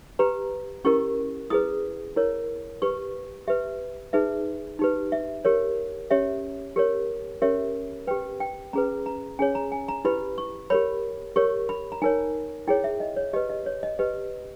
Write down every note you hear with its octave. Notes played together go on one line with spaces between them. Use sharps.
G4 B4 A#5
C#4 E4 G4 A#4 C#6
E4 G#4 B4 D#6
E4 A#4 C#5
G4 B4 C#6
G4 B4 E5
D#4 G#4 B4 E5
D#4 G4 B4
E5
G4 A#4 C#5
C#4 G4 C#5 E5
G4 A#4 C#5
C#4 G4 A#4 C#5 E5
G4 B4 G5
G5
C#4 G#4 B4 A#5
A#5
C#4 G#4 C#5 G#5
A#5
G#5
A#5
E4 G4 B4 B5
C#6
G4 A#4 C#5 B5
G4 A#4 C#5 C#6
B5
A#5
D#4 A#4 C#5 G#5
E4 G#4 C#5 G5
E5
D#5
C#5
G4 B4 D#5
D#5
C#5
D#5
G4 B4 D#5